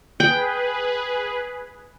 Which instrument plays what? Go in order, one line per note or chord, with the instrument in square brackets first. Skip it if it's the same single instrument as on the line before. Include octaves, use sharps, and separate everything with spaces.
[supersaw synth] G#4 B4 [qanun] G5